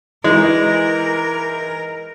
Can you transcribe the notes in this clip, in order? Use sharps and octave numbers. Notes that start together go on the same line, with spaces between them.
E3 G#3 D#4 A#4